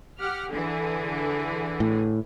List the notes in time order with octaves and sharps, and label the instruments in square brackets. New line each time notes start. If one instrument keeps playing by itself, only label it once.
[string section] G4 F#5 F6
D3 E3 G#4
[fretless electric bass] A2